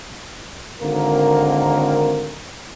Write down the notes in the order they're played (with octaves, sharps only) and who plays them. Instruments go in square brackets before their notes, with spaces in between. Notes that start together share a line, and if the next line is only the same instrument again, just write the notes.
[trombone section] G#1 D3 A#3 C4 A#4